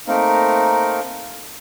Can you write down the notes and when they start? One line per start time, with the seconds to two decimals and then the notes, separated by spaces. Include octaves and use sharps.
0.08 A3 A#3 C4 D#4 A#4